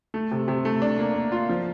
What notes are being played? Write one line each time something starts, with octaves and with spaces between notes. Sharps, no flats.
A3
C3
C3
A3
D4
A#3
A#3
F4
F3